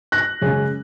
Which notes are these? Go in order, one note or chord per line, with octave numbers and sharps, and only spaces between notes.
F#6 A#6
F#2 C#3 G#3 C#4